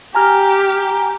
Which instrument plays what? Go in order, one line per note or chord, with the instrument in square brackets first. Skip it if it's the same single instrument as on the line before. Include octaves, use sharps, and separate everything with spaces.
[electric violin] G4 [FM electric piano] G#5 A#5 F6